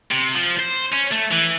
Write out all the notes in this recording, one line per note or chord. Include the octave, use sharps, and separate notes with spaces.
C3
F3
C5
C#4
A3
E3